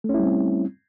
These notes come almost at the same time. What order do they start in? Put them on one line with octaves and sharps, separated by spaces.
A3 C#4 E4 G3 C4